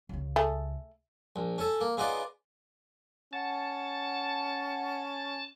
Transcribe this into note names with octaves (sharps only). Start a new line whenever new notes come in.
C#2 C#3
A3 G#4
A#1
C#4 A4
A#3
C#3 B3 D#4 F4 D5
C#4 F#5 A5